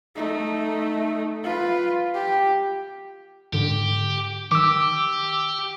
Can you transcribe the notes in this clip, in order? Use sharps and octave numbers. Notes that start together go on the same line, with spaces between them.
A3 D#4
F4 B4
G4
G#2 D3 G4
D#3 G4 D6 E6